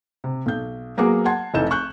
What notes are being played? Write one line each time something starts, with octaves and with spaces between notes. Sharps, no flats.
C3
B1 G6
F#3 A#3 B3 F#4 G#4 D6
F#5 A5 C6 G#6
F1 E3 D#4 A4 G6 E7
C#6 F#6 G6